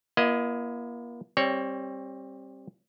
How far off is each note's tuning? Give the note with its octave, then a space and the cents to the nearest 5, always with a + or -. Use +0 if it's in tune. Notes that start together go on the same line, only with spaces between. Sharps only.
A#3 +35 E4 +40 D#5 +0
G3 +0 C4 +25 C#5 +10